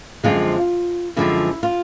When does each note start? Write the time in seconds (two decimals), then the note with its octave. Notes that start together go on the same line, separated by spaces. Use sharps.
0.24 F#2 D3 F3 G#3 C4 F4
1.16 F#2 D3 F3 G#3 C4 E4
1.63 F4